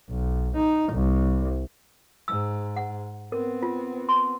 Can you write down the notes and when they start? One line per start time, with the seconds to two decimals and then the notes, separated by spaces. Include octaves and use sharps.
0.10 B1
0.56 D#4
0.93 C2
2.28 G#2 E6
2.76 F#5
3.32 B3 C4 A#4
3.63 F4
4.09 C6